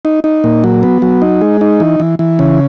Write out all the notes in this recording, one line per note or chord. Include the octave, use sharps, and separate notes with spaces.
D#4
D#4
A#2
F#3
B3
F#3
D#4
G#3
D#4
E3
E3
E3
C#3